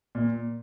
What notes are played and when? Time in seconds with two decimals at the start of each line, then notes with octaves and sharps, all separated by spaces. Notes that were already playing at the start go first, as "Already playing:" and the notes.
0.15 A#2